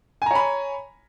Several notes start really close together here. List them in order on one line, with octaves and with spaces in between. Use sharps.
G#5 A#5 C#5 B5